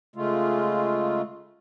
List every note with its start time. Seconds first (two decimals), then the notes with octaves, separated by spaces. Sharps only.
0.16 C#3 G#3 A3 F4